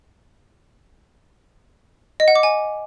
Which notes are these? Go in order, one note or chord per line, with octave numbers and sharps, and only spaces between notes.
D#5
F#5
D6
G#5